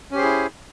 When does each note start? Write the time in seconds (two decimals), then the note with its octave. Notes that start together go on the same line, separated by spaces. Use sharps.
0.11 C#4
0.14 G4
0.17 C5
0.20 G#4
0.23 E4